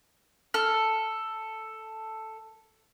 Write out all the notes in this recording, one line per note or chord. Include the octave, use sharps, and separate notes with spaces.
A4 F6